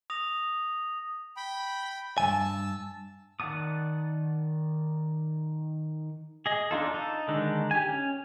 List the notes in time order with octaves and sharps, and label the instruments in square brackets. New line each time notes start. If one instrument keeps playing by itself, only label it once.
[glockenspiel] D#6 A#6 F7
[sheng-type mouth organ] G5 B5
[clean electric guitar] G2 D#3 G#5 [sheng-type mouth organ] A5 E6
[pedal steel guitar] D#3 D5 F#5 A5 D#6
G#4 D#5
D4 D#4 F4 A4
D#4 A4
D3 D#3 G#3 D4 D#4
G4 G#5
C#4